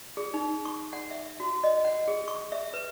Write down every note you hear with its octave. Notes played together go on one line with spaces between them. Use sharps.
G#4
D#4
C#6
F#5
E5
F#4
D#5
F#5
G#4
C#6
E5
B4